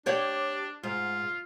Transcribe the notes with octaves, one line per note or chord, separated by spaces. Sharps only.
D4 G4 C#5 D5
G#2 F4